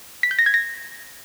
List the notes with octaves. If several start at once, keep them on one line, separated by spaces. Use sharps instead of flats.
B6
G6
A#6
G#6
A#6